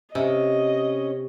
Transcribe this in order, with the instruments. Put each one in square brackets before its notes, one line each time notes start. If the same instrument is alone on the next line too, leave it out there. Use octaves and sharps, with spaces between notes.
[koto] C3 [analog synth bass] C#4 [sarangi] D#5